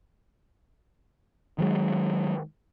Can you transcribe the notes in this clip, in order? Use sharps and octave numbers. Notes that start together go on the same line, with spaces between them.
D#3 F#3 G#3